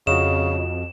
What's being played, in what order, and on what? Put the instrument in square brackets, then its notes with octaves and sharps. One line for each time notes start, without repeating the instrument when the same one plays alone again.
[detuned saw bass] F2 [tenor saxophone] C#3 [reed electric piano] F#4 D#5 [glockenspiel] E7